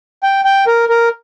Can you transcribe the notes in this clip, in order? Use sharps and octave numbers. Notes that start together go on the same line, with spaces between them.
G5
G5
A#4
A#4